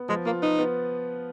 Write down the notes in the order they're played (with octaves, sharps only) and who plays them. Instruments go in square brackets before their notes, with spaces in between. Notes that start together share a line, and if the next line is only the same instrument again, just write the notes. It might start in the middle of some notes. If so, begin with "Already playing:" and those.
Already playing: [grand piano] B3
[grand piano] F3 [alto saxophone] G#3
[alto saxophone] A#3 [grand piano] F4
[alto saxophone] D#4 [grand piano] B4
[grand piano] B3